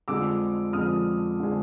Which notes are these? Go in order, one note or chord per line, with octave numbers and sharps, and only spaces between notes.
F2 D3 F3 G#3 D6 E6
F2 D3 F3 G#3 D#6 F6
D3 F3 G#3